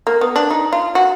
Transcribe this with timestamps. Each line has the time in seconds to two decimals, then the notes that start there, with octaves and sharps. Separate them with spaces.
0.07 A#3
0.21 B3
0.36 D4
0.51 D#4
0.73 F4
0.95 F#4